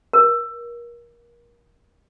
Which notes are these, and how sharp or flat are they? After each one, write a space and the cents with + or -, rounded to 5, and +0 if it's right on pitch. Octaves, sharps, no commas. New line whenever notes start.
A#4 +25